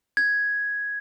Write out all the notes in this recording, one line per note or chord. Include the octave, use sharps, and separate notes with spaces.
G#6